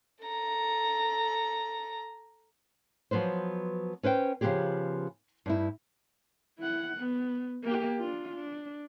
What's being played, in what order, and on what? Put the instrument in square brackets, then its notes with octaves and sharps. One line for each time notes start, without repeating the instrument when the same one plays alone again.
[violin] A4 A#5
[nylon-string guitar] F3 F#3 B3 B4 C5
C#4 B4 C5 G5
C#3 F3 A3 B3 G4 G#4
G2 D#4 E4
[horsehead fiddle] E4 F#5
B3
A#3 G4
D4 F4
D4